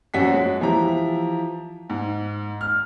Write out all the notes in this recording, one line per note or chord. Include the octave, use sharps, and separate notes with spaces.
F#2 F3 F#4 B6
G#3
E3 F3 G4 E5 A#5
G#2
F6